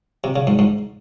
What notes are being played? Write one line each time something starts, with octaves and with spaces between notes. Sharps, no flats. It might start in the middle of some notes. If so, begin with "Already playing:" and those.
C3
C#3
G#2
G#2